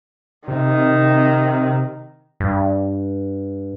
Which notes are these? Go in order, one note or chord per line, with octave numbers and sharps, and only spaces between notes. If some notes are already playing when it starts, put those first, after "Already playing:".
C3 D#3
G2